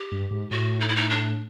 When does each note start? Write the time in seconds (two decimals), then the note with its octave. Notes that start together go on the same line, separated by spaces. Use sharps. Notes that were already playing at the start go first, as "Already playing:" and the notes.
Already playing: G4
0.12 G2
0.31 G#2
0.51 A2 F#4
0.80 D#4
0.89 E4
0.96 D#4
1.10 D4